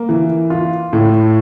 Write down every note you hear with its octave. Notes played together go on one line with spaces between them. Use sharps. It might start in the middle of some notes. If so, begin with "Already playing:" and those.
Already playing: A#3
E3
F4
A2